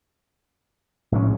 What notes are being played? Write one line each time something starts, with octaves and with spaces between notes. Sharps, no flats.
A#1 A2 G#3 C#4